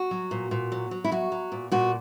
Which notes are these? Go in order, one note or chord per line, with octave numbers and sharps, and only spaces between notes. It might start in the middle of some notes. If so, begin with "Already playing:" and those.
Already playing: F#4
F#3
A#2
A#2
F#3
F#3
E4
F#3 F#4
F#3
A#2
A#2 F#4